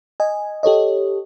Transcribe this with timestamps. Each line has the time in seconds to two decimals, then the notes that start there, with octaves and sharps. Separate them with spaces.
0.20 D#5 G#5
0.63 G4 A4 C#5 D#5